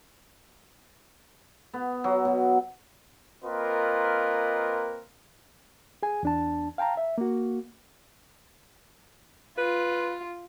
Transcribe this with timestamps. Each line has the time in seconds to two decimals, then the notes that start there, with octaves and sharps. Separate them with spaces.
1.74 B3
2.04 F#3
2.25 B2
3.44 A#3 C4 F4 A#4 B4 D#5
6.03 G#4 G#5
6.23 E2 D4 A5
6.78 F5 G5 A5 A#5
6.97 E5
7.18 A#3 F#4
9.58 F4 B4